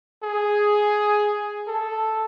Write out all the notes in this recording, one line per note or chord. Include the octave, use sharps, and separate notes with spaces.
G#4
A4